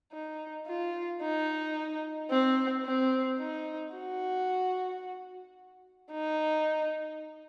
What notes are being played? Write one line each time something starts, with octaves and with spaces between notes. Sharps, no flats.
D#4
F4
D#4
C4
C4
D#4
F#4
D#4